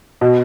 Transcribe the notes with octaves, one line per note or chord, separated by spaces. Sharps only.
B2